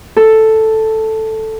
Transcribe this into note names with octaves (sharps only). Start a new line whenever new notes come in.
A4